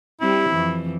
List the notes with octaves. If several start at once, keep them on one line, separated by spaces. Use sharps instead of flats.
G3 C4 E4
F2 E3